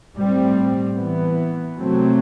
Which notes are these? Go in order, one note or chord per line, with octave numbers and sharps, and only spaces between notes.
A2 G3 C4
E3 B3
C3 F#3 A3 C4